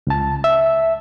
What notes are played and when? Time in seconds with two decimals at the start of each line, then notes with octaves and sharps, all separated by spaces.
0.07 C#2 A5
0.44 E5